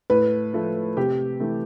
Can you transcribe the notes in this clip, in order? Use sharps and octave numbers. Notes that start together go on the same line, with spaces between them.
A2 B4
F3 A3
C3 G4
E3 A3